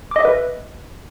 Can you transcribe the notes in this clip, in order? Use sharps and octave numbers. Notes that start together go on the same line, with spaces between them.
B4 D#5 E5 D6